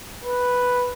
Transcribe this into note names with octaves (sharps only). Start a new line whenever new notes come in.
B4